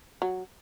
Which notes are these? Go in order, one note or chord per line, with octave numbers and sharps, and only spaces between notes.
F#3